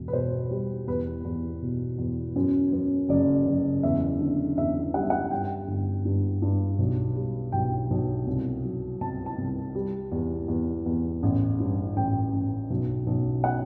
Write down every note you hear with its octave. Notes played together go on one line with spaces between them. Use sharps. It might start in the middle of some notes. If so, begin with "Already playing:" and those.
Already playing: E1 B2
B4
B2 C5
G3
E2 B4
E2
B2
E2
F#2
F#2
F#1 D5
F#1
E2 E5
D3
E2 E5
G3 F#5
E5
F#5
G2 G5
G1
G2
G2
B1
G3
B1 G5
B1
C2
F#3
C2 A5
A5
C2
G3
E2
E2
E2
A1
G2
A1 G5
A1
B1
B1
F#5